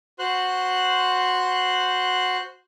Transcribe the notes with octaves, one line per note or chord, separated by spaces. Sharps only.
F#4 C5 C6 F#6